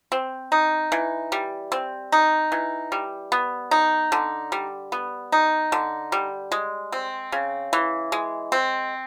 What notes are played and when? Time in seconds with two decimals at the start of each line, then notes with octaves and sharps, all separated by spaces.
0.12 C4
0.52 D#4
0.92 E3
1.32 G3
1.72 C4
2.12 D#4
2.52 E3
2.92 G3
3.32 B3
3.71 D#4
4.12 D3
4.52 G3
4.92 B3
5.32 D#4
5.72 D3
6.12 G3
6.52 G#3
6.92 C4
7.32 C#3
7.73 E3
8.12 G#3
8.52 C4